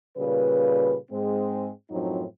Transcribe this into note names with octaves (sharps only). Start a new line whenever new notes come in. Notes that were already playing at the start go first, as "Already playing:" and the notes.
A#2 C#3 G3 B4
G#2 G#3 C4
F#2 A2 F3 F#3 C4 D#4